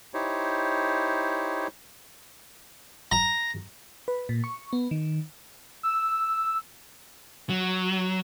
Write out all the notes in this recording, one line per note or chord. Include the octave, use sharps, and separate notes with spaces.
D#4 E4 G4 C5 C#5
A#5
B4
A#2
C#6
B3
D#3
E6
F#3